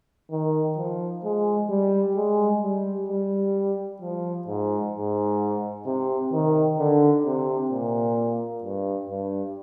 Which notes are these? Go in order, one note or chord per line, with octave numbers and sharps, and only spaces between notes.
D#3
F3
G#3
G3
G#3
G3
G3
F3
G#2
G#2
C3
D#3
D3
C3
A#2
G2
G2